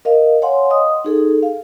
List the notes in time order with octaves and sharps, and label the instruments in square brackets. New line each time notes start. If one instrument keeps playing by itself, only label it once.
[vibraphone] A#4 D#5 F5
C#5 F5 F#5 G#5 C6
D#5 D#6
D#4 G#4 A4
F5